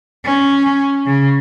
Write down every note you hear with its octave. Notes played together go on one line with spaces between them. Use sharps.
C#4
C#3